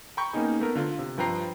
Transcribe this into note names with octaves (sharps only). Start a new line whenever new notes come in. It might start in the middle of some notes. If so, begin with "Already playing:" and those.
G5 A#5 B5 C#6 G6
A#3 B3 C#4 D#4 G#4
A3 B3 A#4
D3 F4
C3
G2 F3 B4 G5 A#5 C7